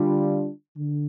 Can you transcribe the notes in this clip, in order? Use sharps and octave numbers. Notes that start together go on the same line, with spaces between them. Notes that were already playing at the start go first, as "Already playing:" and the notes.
Already playing: D3 G3 D4 F4
D3